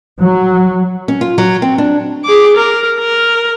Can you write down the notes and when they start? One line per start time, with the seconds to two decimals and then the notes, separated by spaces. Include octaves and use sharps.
0.21 F#3
1.08 C#4
1.21 F4
1.38 F#3
1.62 C4
1.78 D4
2.24 G#4 D6
2.57 A#4
2.99 A#4